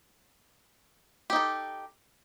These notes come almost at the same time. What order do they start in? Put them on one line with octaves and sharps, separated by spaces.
G4 D#4 A4